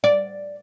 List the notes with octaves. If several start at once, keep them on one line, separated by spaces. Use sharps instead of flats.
D5